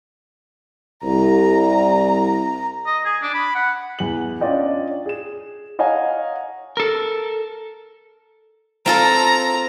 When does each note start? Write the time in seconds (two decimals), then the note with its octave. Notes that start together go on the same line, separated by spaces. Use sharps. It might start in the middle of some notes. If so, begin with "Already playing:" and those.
1.04 C2 A#5
2.86 D#5
3.05 G#4
3.23 D4
3.34 B5
3.55 F#5
3.99 E2 F#7
4.41 C#4 D4 F4 D5 D#5 G5
5.06 G#4 E7
5.79 C#5 D#5 F5 F#5 G#5 A#5
6.77 A4 A#4
8.86 C4 F4 A4 A#5